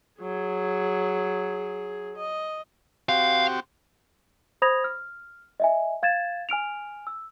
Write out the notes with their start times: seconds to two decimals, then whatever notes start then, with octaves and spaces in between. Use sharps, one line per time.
0.20 F#3 G#4
2.16 D#5
3.09 C4 F#4 G4 F5
4.62 C5 B5 D#6 G#6 A#6 F7
4.84 F6
5.60 D#5 E5 G#5
6.03 F5 G#6 A6 E7
6.49 G#5 F6 D7 F7
7.07 E6